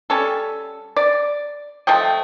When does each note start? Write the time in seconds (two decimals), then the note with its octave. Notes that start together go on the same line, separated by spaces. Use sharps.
0.10 G3 C#4 A4
0.97 D5
1.87 F3 A3 D#5 G5